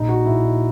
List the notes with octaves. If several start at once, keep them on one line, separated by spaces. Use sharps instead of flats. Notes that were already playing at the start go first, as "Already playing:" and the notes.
Already playing: A#1 D#4
F#4
A#1 E4
D#4